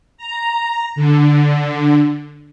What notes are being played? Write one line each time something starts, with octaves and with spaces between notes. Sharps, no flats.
A#5
D3